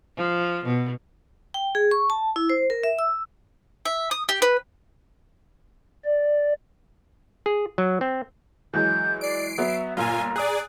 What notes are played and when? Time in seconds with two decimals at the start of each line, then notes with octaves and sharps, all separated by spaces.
0.17 F3
0.65 B2
1.54 G5
1.75 G#4
1.91 C#6
2.10 A5
2.36 E4
2.50 C5
2.70 A#4
2.84 E5
2.99 E6
3.85 E5
4.11 D#6
4.29 G4
4.42 B4
6.05 D5
7.46 G#4
7.78 F#3
8.01 C4
8.74 E3 F#3 G#3 G6
9.21 D5 C7 D7
9.58 F#3 B3 E5
9.97 G1 A#2 F4 G#5 A#5
10.36 G#4 D5 D#6 F#6